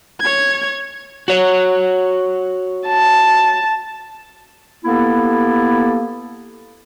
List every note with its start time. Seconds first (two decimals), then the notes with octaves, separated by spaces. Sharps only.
0.21 C#5 G#6
1.28 F#4 C#5
2.88 A5
4.84 A#3 B3 E4 G4 A4